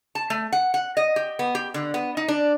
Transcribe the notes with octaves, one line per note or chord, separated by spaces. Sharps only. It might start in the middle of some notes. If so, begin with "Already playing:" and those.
A5
A3
F#5
F#5
D#5
G4
B3
G4
D3
B3
D#4
D4